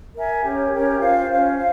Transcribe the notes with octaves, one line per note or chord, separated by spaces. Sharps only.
A#4 E5 G#5
C#4 G4 A#4 C#5
C#4 G4 A#4 C#5
C#4 F4 C5 F5
C#4 F4 C5 F5
C5 F5